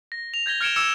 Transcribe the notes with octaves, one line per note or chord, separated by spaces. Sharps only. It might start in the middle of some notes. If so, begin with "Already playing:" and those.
A#6
F7
G6 G#6 A#6 G7
F6 G#6 C#7 D7 E7 G7
D6 E6 G#6 C#7 E7